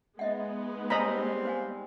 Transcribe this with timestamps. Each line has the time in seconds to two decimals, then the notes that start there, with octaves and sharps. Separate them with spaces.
0.19 G#3 B3 D#4 D#5 E5 F#5
0.90 G3 C4 C#5 D#5 F#5 G#5 A#5 B5
1.45 C5 F5 G#5